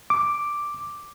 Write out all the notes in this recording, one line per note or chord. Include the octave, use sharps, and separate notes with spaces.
D6